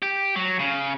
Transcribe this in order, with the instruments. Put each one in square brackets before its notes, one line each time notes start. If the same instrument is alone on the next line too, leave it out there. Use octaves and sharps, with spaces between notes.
[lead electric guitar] G4
F#3
C#3